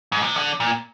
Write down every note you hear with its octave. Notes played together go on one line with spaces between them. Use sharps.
G#2
C3
D3
A#2